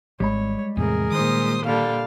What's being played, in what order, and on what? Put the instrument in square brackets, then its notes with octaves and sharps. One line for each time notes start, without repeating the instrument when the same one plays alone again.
[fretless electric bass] G#1 [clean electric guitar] G3 G#3 B5 [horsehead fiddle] C#5
[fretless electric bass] E2 A2 C3 [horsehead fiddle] G#4 A#4
[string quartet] A#2 C5 D#6 [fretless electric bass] D#3
[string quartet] A#2 D3 G3 [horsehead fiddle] F5 A5